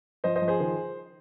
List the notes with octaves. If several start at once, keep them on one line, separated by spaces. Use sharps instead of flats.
F3 C5 D#5
C5 D#5
F3
G#4 C5
D#3